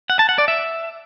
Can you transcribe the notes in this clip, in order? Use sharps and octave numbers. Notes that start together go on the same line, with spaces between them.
F#5
A5
F#5
D5
E5